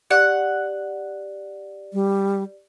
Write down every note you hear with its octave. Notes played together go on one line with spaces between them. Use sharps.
G4 D5 F#5
G3